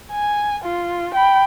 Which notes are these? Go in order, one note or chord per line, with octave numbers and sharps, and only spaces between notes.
G#5
F4
G5 B5